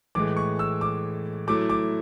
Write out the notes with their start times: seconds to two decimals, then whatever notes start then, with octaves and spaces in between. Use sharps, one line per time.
0.15 A2 E3 G#3 D6
0.37 C#6
0.59 E6
0.81 D6
1.47 F#3 A3 E4 D6
1.70 D6